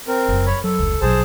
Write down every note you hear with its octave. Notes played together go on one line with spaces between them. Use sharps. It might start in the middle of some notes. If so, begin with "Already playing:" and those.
C4 A#4
F#1 F#2
C#5 B5
F#3 A4
F1 C#2
A#1 B2 F#3 G#4 C5 A5